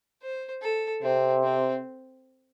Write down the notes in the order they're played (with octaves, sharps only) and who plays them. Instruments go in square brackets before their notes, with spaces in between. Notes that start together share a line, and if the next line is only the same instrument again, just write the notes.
[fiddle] C5
A4
[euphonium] C3 [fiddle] C4
[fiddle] C4